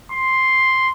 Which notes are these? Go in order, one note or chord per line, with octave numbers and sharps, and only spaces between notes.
C6